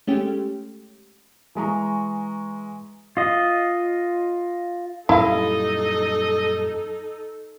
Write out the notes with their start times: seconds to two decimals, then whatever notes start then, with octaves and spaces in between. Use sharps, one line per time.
0.07 G#3 A3 C#4 G4
1.55 E3 G#3 A#5 C#6
3.17 F4 D#5
5.09 F#2 A#2 G3 D#4 E4 A4 D#5 F5